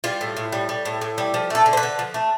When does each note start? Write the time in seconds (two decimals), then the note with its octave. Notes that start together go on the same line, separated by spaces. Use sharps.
0.04 G3 F4
0.21 A2
0.37 A2
0.52 G3
0.69 G3
0.85 A2
1.01 A2
1.18 G3
1.34 F3
1.50 A3 A4
1.66 D3
1.73 C5
1.77 B4
1.83 D3
1.99 F3
2.14 A3